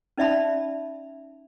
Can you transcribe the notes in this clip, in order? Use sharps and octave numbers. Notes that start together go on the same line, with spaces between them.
C#4 D#4 D5 E5 A5 B5